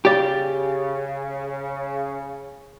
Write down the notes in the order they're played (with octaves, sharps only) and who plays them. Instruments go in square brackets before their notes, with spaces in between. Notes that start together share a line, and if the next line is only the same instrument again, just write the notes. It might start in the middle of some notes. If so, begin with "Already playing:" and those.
[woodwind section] C#3 [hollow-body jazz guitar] G4 D5